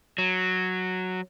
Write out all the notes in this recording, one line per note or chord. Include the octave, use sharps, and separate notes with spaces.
F#3